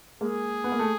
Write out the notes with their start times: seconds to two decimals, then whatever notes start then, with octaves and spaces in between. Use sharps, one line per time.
0.20 G#3 A#3 G#4
0.64 B3
0.72 A#3
0.79 A3